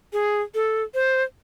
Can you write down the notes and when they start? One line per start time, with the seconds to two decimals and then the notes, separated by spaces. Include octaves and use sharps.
0.13 G#4
0.54 A4
0.94 C5